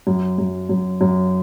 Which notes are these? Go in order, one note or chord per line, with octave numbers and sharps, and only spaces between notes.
F#2
F#2
F#2
F#2